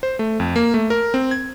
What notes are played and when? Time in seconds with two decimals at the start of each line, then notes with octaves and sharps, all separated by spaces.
0.03 C5
0.19 A3
0.40 F2
0.56 A#3
0.74 A3
0.90 A#4
1.14 C4
1.31 G#6